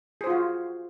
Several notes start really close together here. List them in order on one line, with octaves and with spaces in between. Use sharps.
G#4 C5 F4 F#4